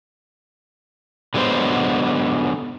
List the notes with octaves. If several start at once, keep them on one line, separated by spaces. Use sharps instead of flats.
D3 F#3 G#3 B3 C5